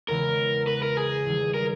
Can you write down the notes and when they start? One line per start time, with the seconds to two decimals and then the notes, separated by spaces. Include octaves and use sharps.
0.08 E2 C#3 E3 G#3 B3 A#4
0.67 B4
0.82 A#4
0.97 G#4
1.25 E2 D#3 G3
1.54 A#4